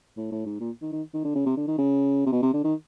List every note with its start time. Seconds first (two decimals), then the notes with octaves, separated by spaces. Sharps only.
0.17 A2
0.32 A2
0.46 G#2
0.60 A#2
0.82 D#3
0.92 D#3
1.14 D#3
1.25 D3
1.35 C#3
1.46 C3
1.57 D3
1.68 D#3
1.78 C#3
2.26 C3
2.32 B2
2.42 C3
2.53 D3
2.64 D#3